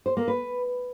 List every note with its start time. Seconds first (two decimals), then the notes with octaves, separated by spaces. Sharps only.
0.06 C5
0.17 A#3
0.28 B4